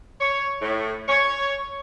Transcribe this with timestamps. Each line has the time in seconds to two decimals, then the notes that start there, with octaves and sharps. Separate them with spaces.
0.21 C#5
0.62 A2
1.08 C#5